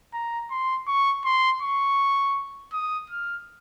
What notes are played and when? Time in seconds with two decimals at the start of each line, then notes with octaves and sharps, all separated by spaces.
0.14 A#5
0.51 C6
0.88 C#6
1.25 C6
1.62 C#6
2.73 D#6
3.10 F6